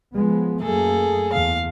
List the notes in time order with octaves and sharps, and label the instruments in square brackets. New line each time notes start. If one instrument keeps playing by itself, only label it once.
[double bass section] F3 G#3 B3
[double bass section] F#2 A3 A#3 [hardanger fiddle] G#4 A4
[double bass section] E2 [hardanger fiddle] F5